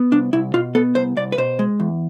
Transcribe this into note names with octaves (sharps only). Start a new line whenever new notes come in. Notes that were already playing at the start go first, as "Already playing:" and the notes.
Already playing: B3
C2 D4
C2 E4
B2 F4
B3 A4
C2 C5
C2 D5
B4
B2 C5
G#3
E2